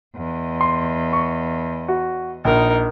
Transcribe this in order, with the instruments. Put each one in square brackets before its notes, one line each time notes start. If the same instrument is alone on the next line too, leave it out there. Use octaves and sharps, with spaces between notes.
[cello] E2 D#5
[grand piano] C6
C#6
F#4
[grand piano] A#1 [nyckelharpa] D#4 A#4